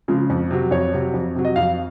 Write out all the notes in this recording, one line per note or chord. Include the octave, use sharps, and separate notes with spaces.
C#3 F3 G#3
F2
C3 F#3
F2 C#5
C3 F#3
F2
C3 F#3
D#5
F2 F5